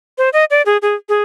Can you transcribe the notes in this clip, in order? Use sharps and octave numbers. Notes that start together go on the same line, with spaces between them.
C5
D#5
D5
G#4
G#4
G#4